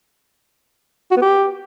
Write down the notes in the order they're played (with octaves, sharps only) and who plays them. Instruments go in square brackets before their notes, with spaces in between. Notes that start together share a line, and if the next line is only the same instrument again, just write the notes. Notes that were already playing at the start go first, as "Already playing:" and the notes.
[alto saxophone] F#4
B3
G4